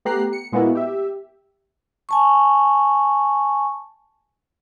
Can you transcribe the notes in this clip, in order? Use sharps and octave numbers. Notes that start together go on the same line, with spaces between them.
A3 B3 G4 A#5 F#6 C7
C#7
A#2 G#3 A#3 B3 E4 F#4
G4 E5
G#5 A5 C#6